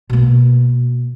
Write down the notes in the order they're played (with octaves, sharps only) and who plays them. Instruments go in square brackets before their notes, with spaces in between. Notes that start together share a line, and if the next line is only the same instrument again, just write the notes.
[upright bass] B2 A#3